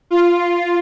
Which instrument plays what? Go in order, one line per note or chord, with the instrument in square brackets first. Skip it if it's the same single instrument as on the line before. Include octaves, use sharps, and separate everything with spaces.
[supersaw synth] F4